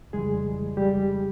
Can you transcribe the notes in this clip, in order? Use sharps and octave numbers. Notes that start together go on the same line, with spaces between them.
F2 C#3 E3 G3 G#3 G#4
G3 G4